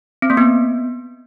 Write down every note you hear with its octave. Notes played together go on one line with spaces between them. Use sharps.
C4
A#3
B3